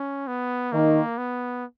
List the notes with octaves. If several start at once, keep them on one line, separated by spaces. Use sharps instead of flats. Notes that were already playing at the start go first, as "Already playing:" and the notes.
Already playing: C#4
B3
D#3 A#3
B3